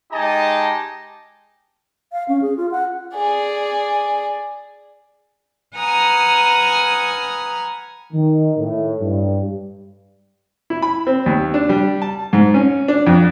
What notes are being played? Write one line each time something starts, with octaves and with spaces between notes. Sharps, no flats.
G#3 D#4 G4 D#5 G#5 A5
F5
C#4
G#4
F4
F#5
G#4 D5
B4 F#5 G#5 A#5 D#6 F6
D#3
A2
G2
E4
B5
C4
D#2
D4
G3
A5
G#2
C#4
D4
F2